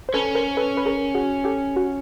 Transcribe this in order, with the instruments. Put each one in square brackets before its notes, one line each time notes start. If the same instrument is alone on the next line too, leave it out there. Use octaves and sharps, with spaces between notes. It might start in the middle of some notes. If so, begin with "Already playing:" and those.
[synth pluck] C5
[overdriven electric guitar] C#4 [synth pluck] A4 B4
[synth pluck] A#4 C5
A4 B4
B4
G#4 A#4
F#4 G#4
G4 A4
F#4